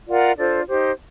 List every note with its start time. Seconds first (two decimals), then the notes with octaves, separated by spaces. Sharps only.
0.08 F4 A#4 D5 F#5
0.38 D4 F4 A4 C5
0.67 D#4 G4 C5